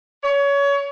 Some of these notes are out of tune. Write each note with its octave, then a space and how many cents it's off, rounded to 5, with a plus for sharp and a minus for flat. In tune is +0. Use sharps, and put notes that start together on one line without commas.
C#5 +25